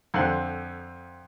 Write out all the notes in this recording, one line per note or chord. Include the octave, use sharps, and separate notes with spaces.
F2 D3 F3 C6 F#6